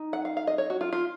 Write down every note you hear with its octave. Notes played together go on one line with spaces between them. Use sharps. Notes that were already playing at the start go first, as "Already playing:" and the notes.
Already playing: D#4
F#5
F5
F5
D#5
C#5
F#4
F4
F4